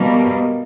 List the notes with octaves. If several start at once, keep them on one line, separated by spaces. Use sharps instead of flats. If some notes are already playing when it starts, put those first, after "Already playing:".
Already playing: B2 G3 A#3